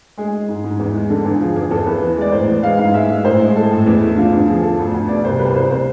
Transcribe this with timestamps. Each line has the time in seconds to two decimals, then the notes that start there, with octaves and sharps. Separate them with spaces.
0.18 G#3 G#4
0.33 G#3
0.49 G#2
0.64 G#2
0.79 E2
0.94 G#3
1.10 D3 A4
1.25 E2 G#4
1.41 F3 G#4
1.56 E2 G#4
1.71 E2 A4
1.86 E2 B4
2.02 E3
2.17 G#3 D5
2.32 A2 C5
2.48 E3
2.63 G#3 F5
2.79 G#2 F5
2.94 G#3 E5
3.09 G#3
3.25 A2 C5
3.39 G#3
3.56 G#3 A4
3.71 A2
3.86 E2 E4
4.01 A3
4.17 D3 F4
4.32 E2
4.47 F3 G#4
4.63 F3 A4
4.79 D2
4.94 D2
5.09 B2 D5
5.24 C2 C5
5.39 C2 B4
5.55 C2 C5
5.70 C3 C5